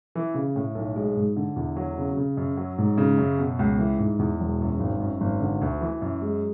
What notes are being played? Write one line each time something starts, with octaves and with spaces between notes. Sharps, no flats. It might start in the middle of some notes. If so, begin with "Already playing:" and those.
E3
C#3
A2
B1
G#3
G#2
D3
E2
F#3
C#3
C#3
F#2
F#3
G#2
C#3
F#2
B2
C#2
E3
G#2
E2
E1
F#2
G#1
F#2
G#1
D3
D2
E3
F#2
G#3